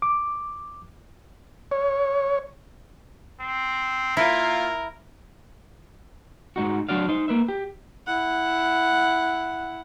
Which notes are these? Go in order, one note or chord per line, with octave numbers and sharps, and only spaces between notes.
D6
C#5
C4
A#3 E4 F4 A#4
G#2 D#4 F#4
F#3 D4 F#4 D5 F5
D#4 C5
A#3 B4 E5
G4
E4 F#5